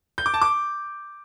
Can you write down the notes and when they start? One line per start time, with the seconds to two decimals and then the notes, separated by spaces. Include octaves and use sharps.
0.18 G6
0.26 D6
0.34 A5
0.42 D6